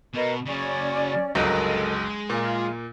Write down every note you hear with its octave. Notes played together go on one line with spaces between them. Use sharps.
B2 A#4 B4 D#5
C#3 F#3 C#4 D5
G1 C#2 F#3 G#3 A4 A#4 D#5
A#2 A#3 F4